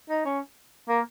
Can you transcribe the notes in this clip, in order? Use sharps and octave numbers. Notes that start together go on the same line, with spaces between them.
D#4
C#4
A#3